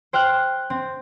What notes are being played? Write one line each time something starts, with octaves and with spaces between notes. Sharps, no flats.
C5 G5 F6 F#6
C4